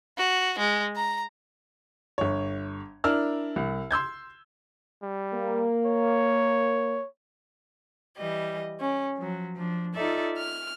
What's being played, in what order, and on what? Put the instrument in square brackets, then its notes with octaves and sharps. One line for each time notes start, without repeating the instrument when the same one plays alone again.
[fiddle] F#4
G#3
A#5
[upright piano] G1 C#5
D4 E4 A#4 E6 F6
C2
C6 E6 G6 G#6
[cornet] G3
[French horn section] A#3
[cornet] C#5
[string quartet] E3 G3 D#5
C#4
F3 F#3
F3 D4
D#4 F4 A4 D5 E5
F6